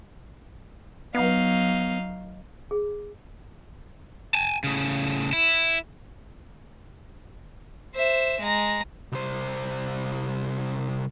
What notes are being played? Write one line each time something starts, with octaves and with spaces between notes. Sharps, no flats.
F#3 B3 D#4 F5
G#4
G#5 A5
A2 C#3
E4
C5 E5
G#3 A#5
C2 C5